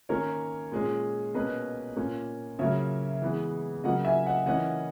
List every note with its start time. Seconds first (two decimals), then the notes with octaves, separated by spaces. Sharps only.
0.09 D#3 A#3 C#4 A#4 C#5
0.72 A#2 G#3 C#4
1.34 B2 A#3 C#4 B4 D#5
1.96 A#2 A#3 C#4
2.59 C#3 F#3 A#3 C#5 E5
3.22 E3 G#3 B3
3.84 C#3 F#3 A#3 D#5 F#5
4.05 E5 G#5
4.26 D#5 F#5
4.46 E3 A#3 C#4 D#5 F#5